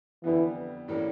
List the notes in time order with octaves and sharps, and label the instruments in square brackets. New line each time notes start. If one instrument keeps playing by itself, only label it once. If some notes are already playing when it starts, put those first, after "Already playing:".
[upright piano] F2 D3 G3 B3 [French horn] E3
[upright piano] A2 E3 G3 A#3 C#4